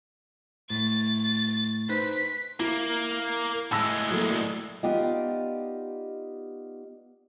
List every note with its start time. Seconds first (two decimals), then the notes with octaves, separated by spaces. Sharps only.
0.70 A2 A6
1.89 D#4 B4 C5 B6
2.60 A#3 E4
3.72 A2 G#3 A5 E6 A#6
4.11 F#3 A3 A#3
4.30 D5
4.83 B3 D#4 F4 G4 D5 D#5